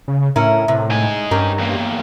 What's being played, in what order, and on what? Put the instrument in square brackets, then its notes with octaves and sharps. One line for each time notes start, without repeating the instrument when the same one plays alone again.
[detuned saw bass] C#3
[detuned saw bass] A2 [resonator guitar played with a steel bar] C#4 E4 A#4
[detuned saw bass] A2 [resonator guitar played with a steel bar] C3
[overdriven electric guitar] D#4 G#5
[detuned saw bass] G2 [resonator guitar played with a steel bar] C#4 G4 A#4
[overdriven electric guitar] E2 A#3